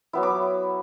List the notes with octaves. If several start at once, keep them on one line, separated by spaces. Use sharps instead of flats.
F#3 B3 E4
D6